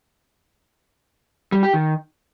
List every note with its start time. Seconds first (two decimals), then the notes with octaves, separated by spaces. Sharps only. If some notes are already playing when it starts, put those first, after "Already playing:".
1.52 G3
1.63 G4
1.74 D#3